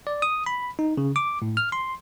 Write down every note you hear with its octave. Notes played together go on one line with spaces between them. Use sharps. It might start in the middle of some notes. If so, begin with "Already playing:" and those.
D5
D#6
B5
D#4
C#3
D6
A2
F6
C6